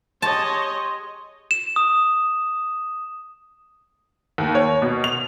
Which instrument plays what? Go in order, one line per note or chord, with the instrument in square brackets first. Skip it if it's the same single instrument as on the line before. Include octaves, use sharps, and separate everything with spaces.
[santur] G#3 G4 [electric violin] C#5 D#5 [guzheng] A5
[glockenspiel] E7
D#6
[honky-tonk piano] D#2
C#5
B2
F7